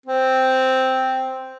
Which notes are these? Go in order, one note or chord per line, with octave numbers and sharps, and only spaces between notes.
C4